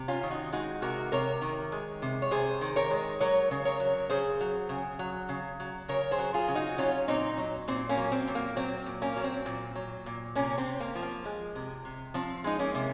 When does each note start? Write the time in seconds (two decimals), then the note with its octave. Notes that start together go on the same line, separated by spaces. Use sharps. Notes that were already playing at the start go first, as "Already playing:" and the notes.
Already playing: C3
0.08 C#4 F4
0.23 D#3
0.30 D#4 F#4
0.52 G#3 D#4 F#4
0.82 C3 F#4 A#4
1.12 C3 A#4 C#5
1.41 D#3
1.72 G#3
2.02 C3
2.22 C#5
2.31 C3 G#4 C5
2.61 D#3
2.76 A#4 C#5
2.90 G#3
3.20 F#3 A#4 C#5
3.51 C#3
3.65 A#4 C#5
3.80 F#3
4.10 C#3 G#4 C5
4.41 F#3
4.69 C#3
4.99 F#3
5.29 C#3
5.60 F#3
5.88 C#3 A#4 C#5
6.11 G#4 C5
6.18 F#3
6.34 F4 G#4
6.48 C#3
6.55 D#4 F#4
6.78 F#3 C#4 F4
7.08 A#2 C4 D#4
7.38 F#3
7.68 A#2 C4
7.89 A#3 C#4
7.97 F#3
8.12 C4
8.27 A#2
8.35 A#3
8.56 F#3 C4
8.86 A#2
9.02 A#3 C#4
9.17 F#3
9.24 C4
9.46 A#2
9.75 F#3
10.06 A#2
10.35 C3 A#3 C#4
10.58 C4
10.65 C3
10.80 A#3
10.95 F3
11.03 A#3
11.25 G#3
11.55 C3
11.85 C3
12.14 F3 C4
12.44 G#3 D#4
12.59 A#3 C#4
12.75 C3